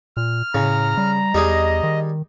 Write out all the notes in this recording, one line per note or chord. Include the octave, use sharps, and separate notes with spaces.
A#2 F6
A2 C#3 A#5
G3
E2 G3 D#4 G#4 D#5
D#3